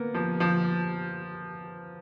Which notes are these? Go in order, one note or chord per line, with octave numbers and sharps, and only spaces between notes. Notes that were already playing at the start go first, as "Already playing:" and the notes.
Already playing: A#3 B3
F3
F3